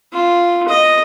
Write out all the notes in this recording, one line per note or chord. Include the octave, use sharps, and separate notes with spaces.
F4
D#5